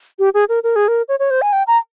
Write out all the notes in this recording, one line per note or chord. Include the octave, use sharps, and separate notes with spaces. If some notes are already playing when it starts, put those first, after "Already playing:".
G4
G#4
A#4
A#4
G#4
A#4
C#5
C#5
C5
G#5
G5
A#5